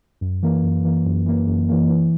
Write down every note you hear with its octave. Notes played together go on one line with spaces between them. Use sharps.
F#2
E3 A#3
F#2
E3 A#3
F#2
E3 A#3
F#2
E3 A#3
E3